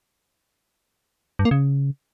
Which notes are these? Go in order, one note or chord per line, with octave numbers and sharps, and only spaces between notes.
G2
A#3
C#3